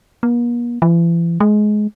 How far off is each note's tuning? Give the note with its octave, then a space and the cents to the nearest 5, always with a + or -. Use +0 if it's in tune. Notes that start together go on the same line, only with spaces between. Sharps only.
A#3 +45
E3 +40
G#3 +20